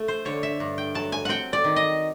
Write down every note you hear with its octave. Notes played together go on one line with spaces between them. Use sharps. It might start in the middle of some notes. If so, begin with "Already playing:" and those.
Already playing: A3
C5
D3 C#5
E5
G2
G5
F#3 A5
G#5
C4 F#5 G5
D5
D#3
D#5